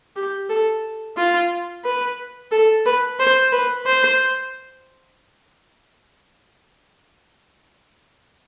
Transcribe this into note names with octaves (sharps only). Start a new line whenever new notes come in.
G4
A4
F4
B4
A4
B4
C5
B4
C5